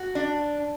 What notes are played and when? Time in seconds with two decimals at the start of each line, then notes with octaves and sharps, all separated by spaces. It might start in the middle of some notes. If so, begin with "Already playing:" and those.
Already playing: F#4
0.15 D4